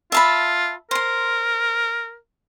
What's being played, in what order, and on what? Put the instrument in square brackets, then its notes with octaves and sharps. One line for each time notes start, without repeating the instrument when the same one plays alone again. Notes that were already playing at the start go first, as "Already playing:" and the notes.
[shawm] F4 [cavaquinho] E5 A5 B5
[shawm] A#4 [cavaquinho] C5 C6